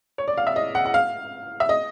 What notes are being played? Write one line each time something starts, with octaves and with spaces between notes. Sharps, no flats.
C#5
D5
F5
E5
D#5
F#5
F#5
F5
E5
D#5